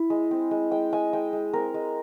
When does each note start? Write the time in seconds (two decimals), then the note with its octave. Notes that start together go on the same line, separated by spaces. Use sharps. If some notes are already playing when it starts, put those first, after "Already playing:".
Already playing: E4
0.10 G#3
0.31 C4
0.51 G#3
0.71 G#3 G5
0.93 G#3 G#5
1.13 G#3 G5
1.33 G#3
1.53 C4 A#4
1.74 G#3